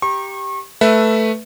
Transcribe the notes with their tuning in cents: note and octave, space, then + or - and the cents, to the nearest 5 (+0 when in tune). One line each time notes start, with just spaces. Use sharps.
G4 +0 A#5 +10 C#6 -35
A3 +0 B4 +0 E5 +0